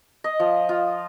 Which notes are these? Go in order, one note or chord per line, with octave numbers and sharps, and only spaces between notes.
D#5
F3
F4